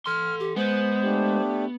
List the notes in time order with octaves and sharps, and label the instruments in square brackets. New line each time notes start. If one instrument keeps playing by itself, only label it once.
[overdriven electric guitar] A4 C6 [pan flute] F6
[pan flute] G4
[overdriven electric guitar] G#3 [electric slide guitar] B3 [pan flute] C5
[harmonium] A3 D4 G4